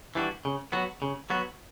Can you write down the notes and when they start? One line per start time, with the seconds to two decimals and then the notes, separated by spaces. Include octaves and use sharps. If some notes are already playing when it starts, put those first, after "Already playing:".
0.15 E3 G3 D4 F#4
0.45 C#3
0.72 F#3 B3 F#4
1.02 C#3
1.30 F#3 B3 F#4